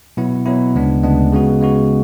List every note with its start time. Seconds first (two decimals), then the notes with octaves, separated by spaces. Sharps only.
0.17 B2 F#3 B3 E4
0.46 B2 F#3 B3 E4
0.75 D2 C#3 G#3 B3 D4
1.03 D2 C#3 G#3 B3 D4
1.32 C#3 G#3 B3 F#4
1.61 C#3 G#3 B3 F#4